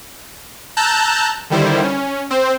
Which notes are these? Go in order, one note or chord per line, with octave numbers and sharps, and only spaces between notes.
A5 A#5 E6 F#6 G6
D3 D#3 G3 E4 C5
C#4
C4 C5